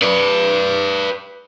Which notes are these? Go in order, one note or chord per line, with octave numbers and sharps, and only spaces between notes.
B4 D5